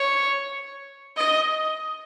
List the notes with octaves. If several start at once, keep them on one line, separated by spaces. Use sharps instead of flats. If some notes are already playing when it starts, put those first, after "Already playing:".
Already playing: C#5
D#5